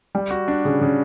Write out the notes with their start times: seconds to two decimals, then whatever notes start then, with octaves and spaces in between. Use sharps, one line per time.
0.15 G3
0.31 F#4
0.48 D4
0.65 C#3
0.81 C#3